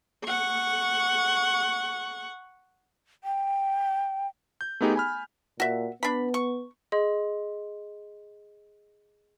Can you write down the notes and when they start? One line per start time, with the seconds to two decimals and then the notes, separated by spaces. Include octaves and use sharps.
0.25 F#5 C#6
3.24 G5
4.61 G6
4.81 A3 B3 D#4 G4 G#4
4.96 G#5 B5 F6
5.60 A#2 F#4 E5
6.03 B3 D4 B5
6.34 C#6
6.92 G#4 D#5 C6